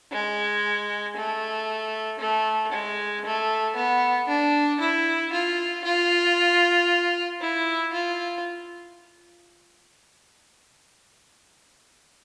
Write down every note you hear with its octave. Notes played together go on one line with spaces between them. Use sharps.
G#3
A3
A3
G#3
A3
B3
D4
E4
F4
F4
E4
F4